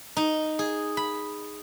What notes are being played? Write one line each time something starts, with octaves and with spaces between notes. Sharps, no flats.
D#4
G#4
B5